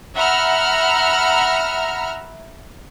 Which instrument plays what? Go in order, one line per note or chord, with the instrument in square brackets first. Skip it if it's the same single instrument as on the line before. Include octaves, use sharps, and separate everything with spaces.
[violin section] E5 F#5 A#5 B5 E6 F6